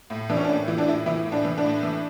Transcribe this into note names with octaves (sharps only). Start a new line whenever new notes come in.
A2
E3 D4
C#4
D4
A2
E3 E4
D4
A2 E4
E3 E4
A2
D4
E3
D4
A2
E3